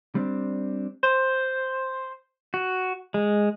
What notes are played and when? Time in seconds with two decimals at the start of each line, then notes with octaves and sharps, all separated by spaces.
0.15 G3 C4 D4
1.03 C5
2.54 F#4
3.14 G#3